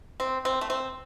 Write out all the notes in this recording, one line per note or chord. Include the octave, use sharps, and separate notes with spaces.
C4
C4
A3
C4